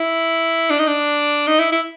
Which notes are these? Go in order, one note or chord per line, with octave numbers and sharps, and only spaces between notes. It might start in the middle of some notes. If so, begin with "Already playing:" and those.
Already playing: E4
D4
D#4
D4
D#4
E4
E4